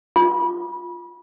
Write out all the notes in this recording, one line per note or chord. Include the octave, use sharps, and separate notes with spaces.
F4